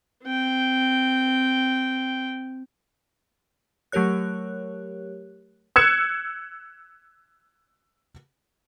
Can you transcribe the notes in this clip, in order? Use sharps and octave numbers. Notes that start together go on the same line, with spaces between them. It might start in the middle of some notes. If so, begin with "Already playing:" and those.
C4 G5
F#3 A3 G4 A#4 C#5 F#6
E6 F#6 G#6 C#7 E7